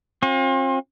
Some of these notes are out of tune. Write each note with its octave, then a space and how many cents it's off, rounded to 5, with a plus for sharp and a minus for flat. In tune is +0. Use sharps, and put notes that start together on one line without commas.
C4 +40 F4 +40